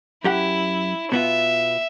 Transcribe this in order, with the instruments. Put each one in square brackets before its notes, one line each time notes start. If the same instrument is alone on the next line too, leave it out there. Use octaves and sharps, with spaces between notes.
[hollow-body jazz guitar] F#2 G4 F#5 [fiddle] E4
[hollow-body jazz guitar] B2 B3 F4 [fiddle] E5